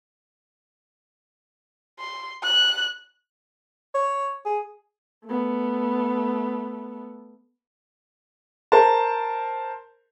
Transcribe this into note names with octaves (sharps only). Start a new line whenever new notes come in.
C6
F#6
C#5
G#4
A3 B3
A#4 C5 A5